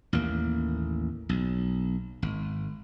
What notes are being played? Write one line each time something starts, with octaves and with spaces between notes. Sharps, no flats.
A1 D#2 A#3
B1
G#1